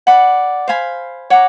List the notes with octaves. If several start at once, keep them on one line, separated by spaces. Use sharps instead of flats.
D5 F#5 B5
C5 F5 G#5 B5
C#5 F#5 A#5 D6